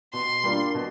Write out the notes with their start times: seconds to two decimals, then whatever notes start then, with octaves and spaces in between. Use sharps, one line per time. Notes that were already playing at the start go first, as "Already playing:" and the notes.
0.13 B2 C6
0.44 G3 A#3 D4 F4
0.75 B2